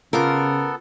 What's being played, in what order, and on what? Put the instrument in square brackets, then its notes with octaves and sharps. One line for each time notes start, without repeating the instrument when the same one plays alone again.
[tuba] C#3 [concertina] B3 A4 [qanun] F4 G5 D6 [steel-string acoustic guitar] A#4